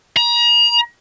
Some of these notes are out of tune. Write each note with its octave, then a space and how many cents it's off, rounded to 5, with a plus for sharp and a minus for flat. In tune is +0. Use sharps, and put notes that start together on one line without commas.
A#5 +35